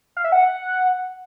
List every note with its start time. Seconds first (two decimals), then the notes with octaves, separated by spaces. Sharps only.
0.17 F5
0.24 E5
0.32 F#5